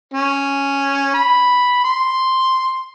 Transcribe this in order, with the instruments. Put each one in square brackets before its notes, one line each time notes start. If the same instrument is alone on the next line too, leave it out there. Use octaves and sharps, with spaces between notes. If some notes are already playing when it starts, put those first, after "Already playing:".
[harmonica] C#4
B5
C6